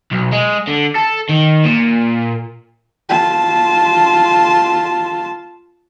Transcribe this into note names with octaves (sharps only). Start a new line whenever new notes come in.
B1
G#3
D3
A4
D#3
A#2
F4 A5